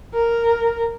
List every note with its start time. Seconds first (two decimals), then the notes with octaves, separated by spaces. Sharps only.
0.14 A#4